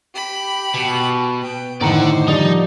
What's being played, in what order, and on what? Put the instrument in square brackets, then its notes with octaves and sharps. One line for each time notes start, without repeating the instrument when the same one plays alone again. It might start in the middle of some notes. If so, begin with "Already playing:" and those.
[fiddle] G4 B5
[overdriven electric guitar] B2
[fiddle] B4 G5
[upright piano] A2 A#5 [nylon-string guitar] D3 D#3 [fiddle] C5 [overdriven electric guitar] D5 F#5
[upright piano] F3 G3 D5 [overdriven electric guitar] D#4